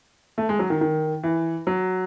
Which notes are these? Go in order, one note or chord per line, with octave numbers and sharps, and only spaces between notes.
A3
G#3
F#3
D#3
D#3
E3
F#3